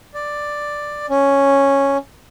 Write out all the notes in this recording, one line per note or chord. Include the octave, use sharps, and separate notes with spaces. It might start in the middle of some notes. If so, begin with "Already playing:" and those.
D5
C#4